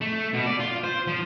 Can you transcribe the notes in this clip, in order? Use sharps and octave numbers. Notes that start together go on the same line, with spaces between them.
A3
B2
D5
F4
C5
F3